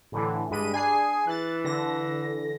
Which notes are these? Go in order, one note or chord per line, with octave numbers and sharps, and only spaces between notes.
A2 D3 E3
G2 G#3 B5 D#7
D4 G#4 G#5 C7
E3 F#6 A6
D3 A#6